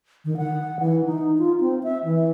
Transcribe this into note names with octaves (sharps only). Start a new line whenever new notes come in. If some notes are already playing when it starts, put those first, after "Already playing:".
D#3
F#5
E3
D#4
F4
C4
E5
E3